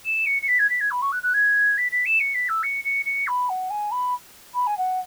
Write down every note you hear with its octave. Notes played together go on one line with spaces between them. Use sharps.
E7
C#7
C#7
B6
G#6
B6
G#6
B5
C#6
F#6
F#6
G#6
B6
B6
E7
C#7
B6
E6
C#7
C#7
C#7
B5
F#5
G#5
B5
B5
G#5
F#5